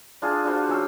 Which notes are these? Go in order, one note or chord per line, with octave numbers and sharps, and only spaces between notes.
D4 F4 G#4
D4 F4 F#4 C5
F#3 C#4 F#4 E6